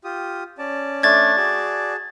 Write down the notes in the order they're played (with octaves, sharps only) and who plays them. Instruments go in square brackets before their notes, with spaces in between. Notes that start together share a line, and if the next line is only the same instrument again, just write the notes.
[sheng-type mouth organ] F4 G4 D#6
C#4 D5 A5
[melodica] A3 D4 [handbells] G#6 A6
[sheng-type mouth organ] F#4 G#4 A5 [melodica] D5